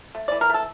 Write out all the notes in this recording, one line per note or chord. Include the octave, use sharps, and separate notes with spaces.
A3
E3 D5
A#4
A3 A4